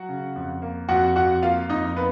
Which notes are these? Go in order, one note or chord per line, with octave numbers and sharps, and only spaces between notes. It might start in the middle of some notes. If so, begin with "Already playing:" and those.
Already playing: F#3 F#4 F#5
C#3
F2
A#3
F2 F#4 F#5
F2 F#4 F#5
A#3 F4 F5
F2 D#4 D#5
A#3 B3 B4